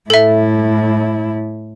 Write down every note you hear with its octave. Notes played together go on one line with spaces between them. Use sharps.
A2 E4 A4 E5